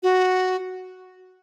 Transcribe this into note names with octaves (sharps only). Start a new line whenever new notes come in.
F#4